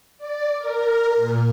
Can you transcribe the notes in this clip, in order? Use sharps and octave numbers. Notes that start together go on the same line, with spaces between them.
D5
A#4
A#2